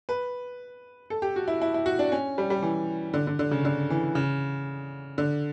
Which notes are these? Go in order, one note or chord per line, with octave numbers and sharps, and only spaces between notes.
B4
A4
G4
F#4
E4
E4
E4
F#4
D4
C#4
G3
G3
E3
D3
D3
D3
C#3
D3
E3
C#3
D3